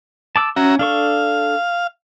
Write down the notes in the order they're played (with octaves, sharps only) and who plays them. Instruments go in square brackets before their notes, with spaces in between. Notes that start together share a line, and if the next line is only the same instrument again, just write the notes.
[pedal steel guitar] A5 D6 E6
[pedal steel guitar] C#4 [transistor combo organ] F#4 E5 A#5
[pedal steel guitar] D4 A4 C#6 [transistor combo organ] F5